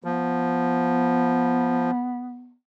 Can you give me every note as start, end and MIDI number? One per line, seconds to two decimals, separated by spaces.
0.04 1.91 53
0.04 2.54 59